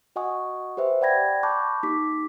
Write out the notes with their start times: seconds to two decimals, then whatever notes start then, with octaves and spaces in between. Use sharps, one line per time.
0.16 F#4 D#5 F#5 G#5 C#6 D#6
0.77 G4 B4 C5 E5
1.01 D5 F#5 G5 B5 G#6 A#6
1.43 A5 B5 C#6 D6 F#6 G6
1.83 A#3 D#4 G4 D6 B6